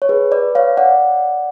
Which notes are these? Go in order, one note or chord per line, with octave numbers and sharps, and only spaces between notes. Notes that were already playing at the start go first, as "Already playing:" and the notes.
C#5
G#4 B4
B4 D5
C#5 F5
D5 F#5